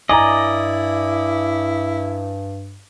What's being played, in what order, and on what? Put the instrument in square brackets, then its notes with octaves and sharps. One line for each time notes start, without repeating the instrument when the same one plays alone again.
[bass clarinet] G2 [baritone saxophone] E4 [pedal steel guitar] D5 D#5 [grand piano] G#5 A#5